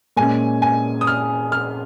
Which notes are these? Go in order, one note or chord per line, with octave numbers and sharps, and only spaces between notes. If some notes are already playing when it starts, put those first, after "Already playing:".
A#2 G#3 C#4 G#5
G#5
D#6
F6
F6